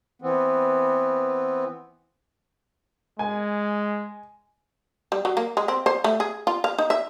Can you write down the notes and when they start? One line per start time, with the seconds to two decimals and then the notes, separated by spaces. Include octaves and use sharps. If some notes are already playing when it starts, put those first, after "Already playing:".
0.22 E3 B3 C4
3.19 G#3 G#5
5.12 G3
5.25 F#3
5.37 A#3
5.57 G#3
5.68 C4
5.86 C5
6.04 A3
6.20 G#4
6.47 F4
6.64 F5
6.78 D#4
6.90 E5